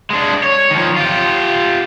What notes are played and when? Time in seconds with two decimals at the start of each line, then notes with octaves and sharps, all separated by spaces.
0.10 G#3 D4
0.44 C#5
0.71 D#3 F3
0.97 F4 G4